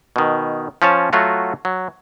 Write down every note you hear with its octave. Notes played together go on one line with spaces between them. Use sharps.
B2 D#3
F3 C#4 C#5 A5
F#3 A3 F4 F#4
F#3